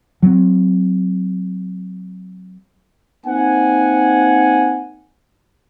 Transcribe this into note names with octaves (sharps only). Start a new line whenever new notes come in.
F#3 C4
A#3 C4 D#4 F#5 G#5